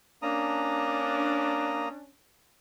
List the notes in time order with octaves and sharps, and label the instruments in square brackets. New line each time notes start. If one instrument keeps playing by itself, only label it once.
[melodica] A#3 A#5 D#6 [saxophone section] C#4 D4